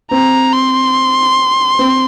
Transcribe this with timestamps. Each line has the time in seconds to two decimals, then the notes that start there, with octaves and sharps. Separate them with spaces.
0.11 C4 A#5
0.53 C6
1.79 C4